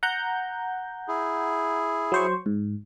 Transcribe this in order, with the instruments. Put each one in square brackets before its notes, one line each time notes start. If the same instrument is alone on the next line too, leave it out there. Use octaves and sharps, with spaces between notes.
[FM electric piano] F#5 A#5 G6
[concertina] E4 G#4
[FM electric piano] F#3 C5 C#6
G#2